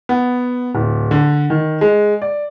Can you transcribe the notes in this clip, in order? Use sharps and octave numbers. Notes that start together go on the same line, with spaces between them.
B3
D1
D3
D#3
G#3
D5